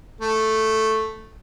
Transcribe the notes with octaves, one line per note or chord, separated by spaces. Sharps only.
A3